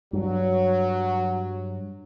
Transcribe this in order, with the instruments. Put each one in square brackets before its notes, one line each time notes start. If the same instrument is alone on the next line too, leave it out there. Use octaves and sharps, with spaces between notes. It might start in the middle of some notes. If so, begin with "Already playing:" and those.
[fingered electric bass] G2 [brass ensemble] F#3